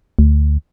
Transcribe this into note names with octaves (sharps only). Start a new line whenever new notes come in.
D2